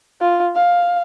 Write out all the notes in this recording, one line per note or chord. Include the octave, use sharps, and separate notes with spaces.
F4
F5